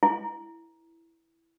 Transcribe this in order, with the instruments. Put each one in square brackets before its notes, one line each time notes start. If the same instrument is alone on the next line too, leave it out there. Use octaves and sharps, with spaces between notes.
[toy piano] E4